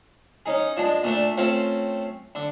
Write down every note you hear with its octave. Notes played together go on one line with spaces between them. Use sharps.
C#4 D#4 G#4
F3 G#3 D4
A#2 A3 D4
A3 C4 C#4 F4
D3